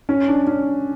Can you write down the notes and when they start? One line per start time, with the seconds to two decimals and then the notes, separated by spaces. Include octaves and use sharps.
0.09 C#4
0.28 D4
0.47 C#4